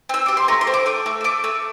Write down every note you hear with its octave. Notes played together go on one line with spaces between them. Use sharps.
C4 E6
G4 D6
C6
A3 A#5
C6
C4
D6
A3 D6
A3
E6
A3 D6
A3 E6